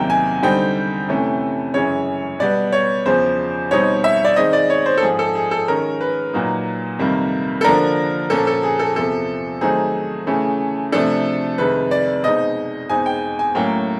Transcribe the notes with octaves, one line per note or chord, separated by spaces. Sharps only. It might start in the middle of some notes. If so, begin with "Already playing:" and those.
Already playing: E2 C3 D#3 F#3 A#3 G5
G#5
D3 G3 C4 D#4 G5
F2 C3 E3 A3 C#4
F#2 C#3 E3 G#3 C#4 C#5
B2 G3 B3 D5
C#5
E2 C#3 F3 C5
B2 G3 C4 D#4 C#5
E5
D5
D#3 G#3 C4 D#4 D#5
D5
C#5
C5
A4
G#2 F3 G#3 G#4
A4
G#4
A4
D#3 G#3 C#4 A#4
B4
A#2 F#3 A#3 D#4
F2 C3 D#3 G3 A#3
A4
D3 F3 A#3 D4 A#4
A#2 F3 A#3 C#4 A4
A4
G#4
A4
E2 C3 F3 A4
D#3 F#3 A3 C4 D#4 G#4
C#3 E3 A3 C#4
C3 F3 A3 D4 A4
F2 C3 D#3 G#3 B4
D5
B2 G#3 C4 D#4 D#5
E2 B2 G#3 C4 D#4 G#5
G5
G#5
A2 F#3 A#3 C#4 G5